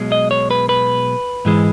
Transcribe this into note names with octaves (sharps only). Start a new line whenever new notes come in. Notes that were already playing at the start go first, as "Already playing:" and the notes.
Already playing: B1 B2 G#3
D#5
C#5
B4
B4
G#2 E3 G#3